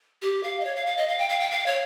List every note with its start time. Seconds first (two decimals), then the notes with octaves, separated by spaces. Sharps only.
0.22 G4
0.43 F5
0.60 D#5
0.65 C#5
0.76 F5
0.86 F5
0.97 D#5
1.08 F5
1.18 G5
1.29 F5
1.40 G5
1.51 F5
1.66 C#5